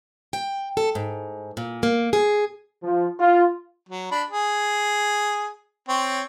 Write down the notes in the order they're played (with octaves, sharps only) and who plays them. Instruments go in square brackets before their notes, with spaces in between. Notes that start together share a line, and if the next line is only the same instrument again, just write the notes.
[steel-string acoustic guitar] G5
A4
G#2
A#2
A#3
G#4
[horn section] F3
F4
[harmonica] F#3
D4 B5
G#4
C4 C#5